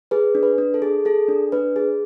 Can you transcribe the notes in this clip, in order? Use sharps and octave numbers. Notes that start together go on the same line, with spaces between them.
G#4 B4
D4
B4
D4
A4
G#4
G#4 A4
D4
D4 B4
G#4